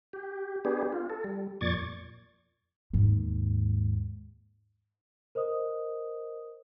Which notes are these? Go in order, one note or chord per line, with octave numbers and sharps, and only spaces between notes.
G4
B3 D4 G4 G#4
F4
A4
G3
F2 A#2 D5 C#6 G#6 A6
D#2 G#2
A#4 C5 D#5 D#6